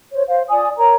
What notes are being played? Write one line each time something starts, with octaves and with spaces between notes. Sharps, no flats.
C5 C#5
C5 F5
F4 D5 G#5 D#6
A#4 C#5 A#5